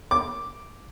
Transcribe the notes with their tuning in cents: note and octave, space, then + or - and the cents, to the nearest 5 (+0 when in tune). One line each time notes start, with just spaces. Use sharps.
D6 +0